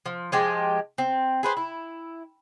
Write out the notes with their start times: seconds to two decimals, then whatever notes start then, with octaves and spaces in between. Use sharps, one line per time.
0.06 F3
0.32 F3 G#3 G4
0.98 C4
1.43 G#4 B4 C5
1.57 E4